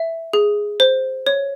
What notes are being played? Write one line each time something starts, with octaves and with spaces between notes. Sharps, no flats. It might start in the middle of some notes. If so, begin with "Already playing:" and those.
Already playing: E5
G#4
C5
C#5